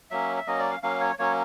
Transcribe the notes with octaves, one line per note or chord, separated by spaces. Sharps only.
F#3 A#3 C#4 E5
E5
F#3 A#3 C#4 D#5
D5
F5
F#3 A#3 C#4 F5
C#5
F#3 A#3 C#4 C#5